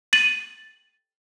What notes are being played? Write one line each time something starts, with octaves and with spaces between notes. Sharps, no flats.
A6 D#7 F#7